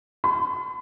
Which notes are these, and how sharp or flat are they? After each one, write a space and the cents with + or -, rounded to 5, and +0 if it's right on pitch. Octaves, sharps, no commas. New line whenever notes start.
B5 +45